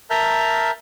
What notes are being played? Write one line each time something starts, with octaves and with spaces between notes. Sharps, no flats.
A#4 E5 A5 A#5 F6 G6